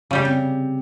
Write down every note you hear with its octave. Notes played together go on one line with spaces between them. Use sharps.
C#3 G3 G4
C3